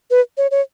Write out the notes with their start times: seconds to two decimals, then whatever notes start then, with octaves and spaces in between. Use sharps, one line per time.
0.11 B4
0.38 C#5
0.51 C#5